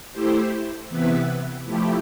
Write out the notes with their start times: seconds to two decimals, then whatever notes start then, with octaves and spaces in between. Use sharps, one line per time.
0.12 A3 E4 G4 C5
0.89 C3 E3 B3 E4 B4
1.65 F3 A3 E4 G4